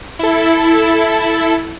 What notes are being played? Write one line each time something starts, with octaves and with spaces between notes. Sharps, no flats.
E4 A4